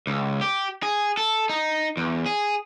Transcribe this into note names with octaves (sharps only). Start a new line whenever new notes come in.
C#2
G4
G#4
A4
D#4
E2
G#4